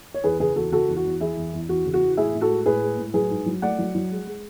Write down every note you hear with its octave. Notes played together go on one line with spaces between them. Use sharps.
C#5
E2 G#4 B4
C#3 G#4 B4
E2 F#4 A4
C#3 F#4 A4
E2
F#4
E2
E3 E4 G#4
E2
E2
E2 F#4
C#3
F#4
E3
A2 E4 G#4
A2
F#4 A4
G#3
A2 G#4 B4
G#3
A2
F#3 G#4 B4
G#2
F#3
A3 D5 F#5
F#3
F#3
G#3
G#3